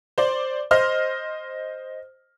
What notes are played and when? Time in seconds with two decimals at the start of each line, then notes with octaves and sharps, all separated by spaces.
0.18 C5 D5
0.71 C5 D#5 F6